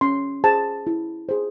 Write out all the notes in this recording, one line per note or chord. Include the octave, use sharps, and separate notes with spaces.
C#4 C6
G#4 C5 A5
E4
G#4 C5